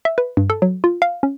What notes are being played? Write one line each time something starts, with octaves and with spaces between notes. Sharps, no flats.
E5
B4
G2
A4
F#3
F4
F5
C#4